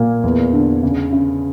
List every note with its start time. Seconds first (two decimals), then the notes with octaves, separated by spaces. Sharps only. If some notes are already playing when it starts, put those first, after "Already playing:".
Already playing: A#2 A#3
0.24 E2
0.53 D3
0.83 C#3
1.13 C#3